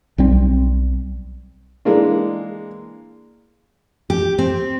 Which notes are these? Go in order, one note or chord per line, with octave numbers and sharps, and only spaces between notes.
B1 G3 C4
E3 G#3 A#3 D4
G4
C4